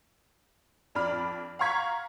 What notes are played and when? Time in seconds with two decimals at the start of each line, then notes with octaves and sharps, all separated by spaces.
0.95 F2 D4 D5 B5 F6
1.59 F5 F#5 A#5 C#6 G#6 B6